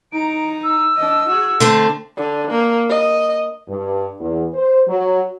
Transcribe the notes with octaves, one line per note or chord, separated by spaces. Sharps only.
D#4 A#5 D7
E6
D4 D#5
F#4 G#4
D3 A3 C4 A5
D3
A#3
D#5
G2
E2
C5
F#3